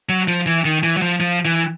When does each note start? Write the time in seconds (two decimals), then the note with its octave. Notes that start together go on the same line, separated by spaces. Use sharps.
0.09 F#3
0.28 F3
0.46 E3
0.65 D#3
0.83 E3
0.97 F#3
1.02 F3
1.21 F3
1.45 E3